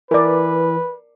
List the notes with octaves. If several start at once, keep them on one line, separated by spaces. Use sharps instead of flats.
E3 A#4 B4 D5